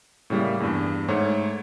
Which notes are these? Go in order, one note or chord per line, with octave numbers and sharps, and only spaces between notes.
A2 C#3 G3 A#3
E2 G2
G#2 A3 C#5